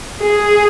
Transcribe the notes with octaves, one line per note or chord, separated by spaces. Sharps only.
G#4